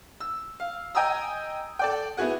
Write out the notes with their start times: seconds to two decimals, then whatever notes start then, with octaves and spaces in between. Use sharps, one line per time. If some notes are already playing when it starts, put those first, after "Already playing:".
0.20 E6
0.60 F5
0.95 D#5 G5 G#5 A#5 D#6 E6
1.79 A4 D5 G5
2.17 B3 E4 F#4 G#4 F#5